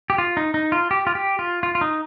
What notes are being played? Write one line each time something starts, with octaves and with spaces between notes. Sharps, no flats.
G4
F4
D#4
D#4
F4
G4
F4
G4
F4
F4
F4
D#4